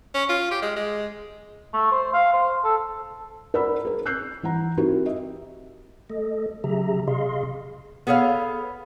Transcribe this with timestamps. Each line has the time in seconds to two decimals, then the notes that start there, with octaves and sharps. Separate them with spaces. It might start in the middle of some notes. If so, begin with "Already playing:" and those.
0.14 C#4
0.29 F4
0.51 G4
0.62 G#3
0.76 G#3
1.74 A3
1.91 C5
2.13 F5
2.33 C5
2.64 A4
3.54 A#4 D5 F#5 B5 E6
3.85 G#4 A#4
4.06 E6 F#6 G6 C7
4.43 E3 F#5 A#5
4.77 C4 D#4 E4 F#4 G4 A#4
5.06 D#5 E5
6.10 A3 A4 D#5
6.64 C#3 F#3 G4 G#4 E5 A#5
7.08 C3 G#4 D#5 F5 C6
8.07 B3 G#4 A4 C#5 F5